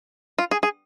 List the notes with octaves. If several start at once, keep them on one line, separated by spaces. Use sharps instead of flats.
F4
G#4
G#4